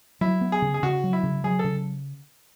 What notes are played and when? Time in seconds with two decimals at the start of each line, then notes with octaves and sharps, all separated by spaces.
0.21 F#3 E4
0.41 B3
0.52 G#4
0.62 C#3
0.74 G#4
0.83 C#3 F#4
1.04 F#3
1.13 E4
1.23 C#3
1.44 F#3 G#4
1.59 A4
1.64 C#3